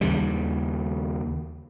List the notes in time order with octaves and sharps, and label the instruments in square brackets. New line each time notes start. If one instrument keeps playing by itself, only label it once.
[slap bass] D#2 C#3 G3